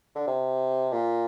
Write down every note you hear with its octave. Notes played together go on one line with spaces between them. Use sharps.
D3
C3
A#2